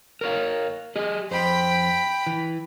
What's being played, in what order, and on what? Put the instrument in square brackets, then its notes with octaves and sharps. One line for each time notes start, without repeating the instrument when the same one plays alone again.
[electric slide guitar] A#4 C#5 F5
G4 G#4 D#5
[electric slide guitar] F2 C5 [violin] G5 B5
[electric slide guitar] E3